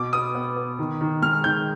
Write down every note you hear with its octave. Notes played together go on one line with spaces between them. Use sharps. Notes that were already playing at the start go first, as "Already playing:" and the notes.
Already playing: B2 D6
B3 D#6
B3
B3
D#3
D#3
G#3 F6
D#3 G6